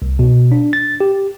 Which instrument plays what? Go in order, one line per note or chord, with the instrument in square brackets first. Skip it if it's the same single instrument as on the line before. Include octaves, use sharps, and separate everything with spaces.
[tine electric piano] C2
B2
D4
A6
G4